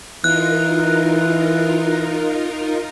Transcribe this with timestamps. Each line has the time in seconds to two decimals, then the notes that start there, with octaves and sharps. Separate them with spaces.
0.24 E3 D#4 F4 A#4 F#6